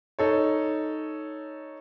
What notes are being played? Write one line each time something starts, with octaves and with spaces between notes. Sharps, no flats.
D#4 A4 C#5